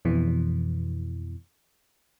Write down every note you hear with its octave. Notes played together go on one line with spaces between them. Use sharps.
F2 B2 E3